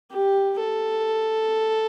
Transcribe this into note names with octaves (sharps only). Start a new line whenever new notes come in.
G4
A4